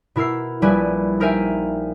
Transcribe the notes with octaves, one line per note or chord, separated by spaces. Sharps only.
B2 E4 A#4 E6 C7
A#1 G3 E4 G4 B4 G#5
D#4 A#4 C5 E5 G5 G#5